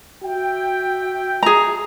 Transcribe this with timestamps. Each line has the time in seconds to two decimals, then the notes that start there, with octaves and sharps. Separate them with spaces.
0.23 F#4 E5 G5
1.43 G#4 A#5